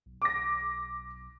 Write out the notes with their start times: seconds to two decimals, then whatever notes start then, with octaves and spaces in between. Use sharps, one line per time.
0.06 B1
0.22 D6 A#6